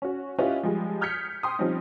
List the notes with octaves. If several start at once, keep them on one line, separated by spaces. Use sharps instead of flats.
C#4 F#4
C#4 E4 F4 G4 B4 D#5
F3 G3 G#3
D#6 F6 G6 G#6 B6 C#7
G5 C6 D#6
F3 G3 C4 C#4 D#4